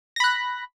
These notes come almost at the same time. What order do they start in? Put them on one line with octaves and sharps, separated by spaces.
A#6 B5 F#6